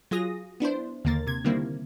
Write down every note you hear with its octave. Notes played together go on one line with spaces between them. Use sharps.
F#3 F4 G#4 D#6 A#6
B3 D4 E4 C5
D#2 D3 A#3 A#4 A6
C3 G#6
D3 D#3 G3 A#3 C4 E4